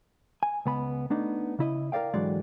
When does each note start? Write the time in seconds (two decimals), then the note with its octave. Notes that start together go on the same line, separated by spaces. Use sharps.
0.43 G#5
0.66 C#2 B3 B5
1.10 A3 B3 D4 D#4
1.59 C#3 E4 D#5
1.92 A#4 C5 D5 F5 G5
2.14 G#2 D3 E3 F#3 G#3 D5